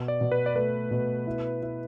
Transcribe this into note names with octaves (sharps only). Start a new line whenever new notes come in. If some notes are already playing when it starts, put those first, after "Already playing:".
Already playing: B2
D5
B2
B4
D5
A3 B4
B2
E4
E4